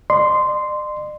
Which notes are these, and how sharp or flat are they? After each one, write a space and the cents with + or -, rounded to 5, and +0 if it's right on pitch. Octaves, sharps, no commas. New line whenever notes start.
D5 +45 C6 -10